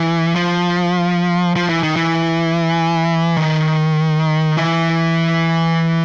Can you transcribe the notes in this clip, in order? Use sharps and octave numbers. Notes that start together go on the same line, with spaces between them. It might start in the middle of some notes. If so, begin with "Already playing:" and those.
Already playing: E3
F3
F3
E3
D#3
E3
D#3
E3